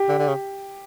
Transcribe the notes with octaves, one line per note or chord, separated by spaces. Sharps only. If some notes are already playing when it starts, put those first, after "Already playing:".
Already playing: G4
D3
D3
C#3